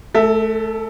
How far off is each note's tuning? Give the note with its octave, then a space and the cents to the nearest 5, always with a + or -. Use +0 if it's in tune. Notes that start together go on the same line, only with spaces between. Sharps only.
A3 -25 A4 +35 E5 +0